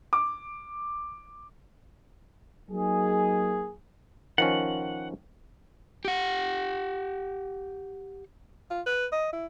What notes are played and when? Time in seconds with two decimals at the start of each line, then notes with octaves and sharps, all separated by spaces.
0.13 D6
2.70 F#3 A#3 D#4 G#4
4.38 D#3 F3 C#4 F#5
6.05 G4 F#5
8.71 F4
8.86 B4
9.12 D#5
9.32 E4